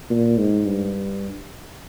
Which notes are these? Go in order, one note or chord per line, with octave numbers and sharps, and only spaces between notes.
A#2
G#2
G2